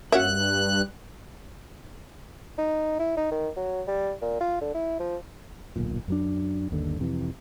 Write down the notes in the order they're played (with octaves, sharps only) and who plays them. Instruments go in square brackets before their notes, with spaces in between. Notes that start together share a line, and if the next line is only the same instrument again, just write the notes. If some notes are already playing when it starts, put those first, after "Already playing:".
[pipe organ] G2 F#6 [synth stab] A#3 C#4 F#4 [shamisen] E5
[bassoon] D#4
E4
D#4
D#3
F#3
G3
A#2
F4
D3
E4
F3
[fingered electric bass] D1 B1 A#2
F#2 F#3 D4
G1 D#2 D3
F2 C3 E3